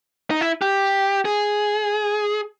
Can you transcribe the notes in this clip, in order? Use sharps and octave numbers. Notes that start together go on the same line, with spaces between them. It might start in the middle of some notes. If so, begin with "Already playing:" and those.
D#4
E4
G4
G#4